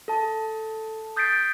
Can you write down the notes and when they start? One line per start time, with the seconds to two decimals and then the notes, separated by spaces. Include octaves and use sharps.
0.08 A4 A5
1.16 D#6 G6 A6 B6 C7 D7